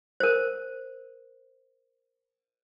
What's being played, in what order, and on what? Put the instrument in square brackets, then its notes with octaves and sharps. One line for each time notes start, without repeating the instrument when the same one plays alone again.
[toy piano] A#4 C5